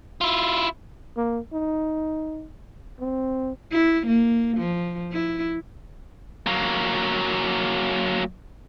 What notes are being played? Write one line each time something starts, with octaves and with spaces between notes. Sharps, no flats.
E4 F4
A#3
D#4
C4
E4
A#3
F3
E4
F#3 A#3